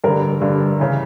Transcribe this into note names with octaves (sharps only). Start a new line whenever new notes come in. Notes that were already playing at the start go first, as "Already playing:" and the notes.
G2 D3 A#4
G2 D3
C#3 E3